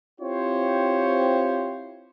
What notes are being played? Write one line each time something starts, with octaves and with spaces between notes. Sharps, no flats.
C4 E4 F4 G4 C5 C#5